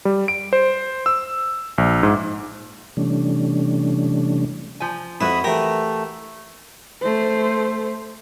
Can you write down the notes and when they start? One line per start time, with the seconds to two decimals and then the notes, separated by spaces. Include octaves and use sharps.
0.05 G3
0.28 D7
0.53 C5
1.06 E6
1.78 A#1
2.03 G#2
2.97 C3 E3 G3 A3 C#4 D4
4.80 F3 G#5
5.21 F2 E4 F#4 B4 E5 B5 D#6
5.44 E3 A3 G4 A#4
7.02 A3 C5